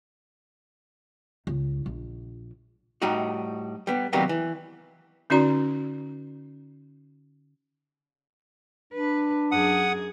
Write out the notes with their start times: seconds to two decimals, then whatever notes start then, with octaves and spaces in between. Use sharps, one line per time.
1.47 C#2
1.86 A#1
3.02 A2 G3 D#4 F#4
3.87 G3 B3
4.13 C3 D#3 F#3 G3 A#3 B3
4.29 E3
5.30 D3 C#4 D#4 F#4 D5 A#5
8.93 D4 B4
9.52 F#2 G#4 F#5 D#6